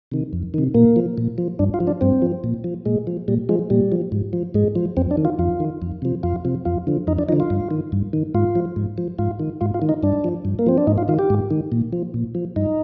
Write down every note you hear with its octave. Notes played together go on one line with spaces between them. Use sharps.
C3 D#3
F2
C3 D#3
A#2 A#3
F3
A#2
F3
G2 D4
F4
F3
D4
G2 C4
F3
A#2
F3
A#2 G#3
F3
A#2 G3
F3 G#3
A#2 G3
F3
G#2
F3
G#2 G#3
F3
F2 C4
D4
D#3
F4
F2 F4
D#3
F2
C3 F3
F2 F4
C3 F3
F2 F4
D3 F3
F2 D#4
D4
D3 F3 D#4
F4
G2
D#3
G2
D#3
G#2 F4
F3
G#2
F3
G#2 F4
D#3
G#2 F4
F4
D#3
D#4
G2 D4
F3
G2
A#3
F3 C4
D4
G#2 D#4
F4
D#3 F4
G4
G#2
D#3
A#2
F3
A#2
F3
G2 D#4